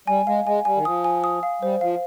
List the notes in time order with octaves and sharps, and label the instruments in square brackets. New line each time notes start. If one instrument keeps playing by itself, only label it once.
[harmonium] G3 [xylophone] G#5
[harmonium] G#3 [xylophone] F5
[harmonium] G#3 [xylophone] G#5
[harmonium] G3 [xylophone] G#5
[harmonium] D#3
[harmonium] F3 [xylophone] D#6
[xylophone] G#5
D#6
F5
[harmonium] G3 [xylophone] C5
[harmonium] F3 [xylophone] F5